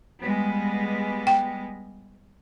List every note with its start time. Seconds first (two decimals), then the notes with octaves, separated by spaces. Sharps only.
0.24 G3 G#3 B3
1.27 G5